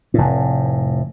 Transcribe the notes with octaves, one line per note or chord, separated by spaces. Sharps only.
F1 A2